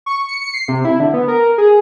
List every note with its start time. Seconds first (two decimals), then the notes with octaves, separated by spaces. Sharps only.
0.06 C#6
0.29 C#7
0.41 C#7
0.54 C7
0.68 C3
0.85 E4
1.00 D3
1.14 B3
1.28 A#4
1.58 G#4